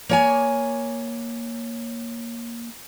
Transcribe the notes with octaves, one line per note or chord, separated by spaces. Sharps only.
A#3 C#5 G#5